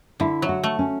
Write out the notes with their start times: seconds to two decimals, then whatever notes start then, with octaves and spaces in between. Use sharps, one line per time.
0.20 D3 E4
0.42 F#3
0.49 F#4
0.64 A3
0.79 C#4